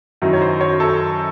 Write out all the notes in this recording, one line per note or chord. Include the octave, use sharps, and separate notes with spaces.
F#2 D#3 F#3 E4
C#5
C5
C#5
A4